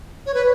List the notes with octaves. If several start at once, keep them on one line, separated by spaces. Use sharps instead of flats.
C#5
B4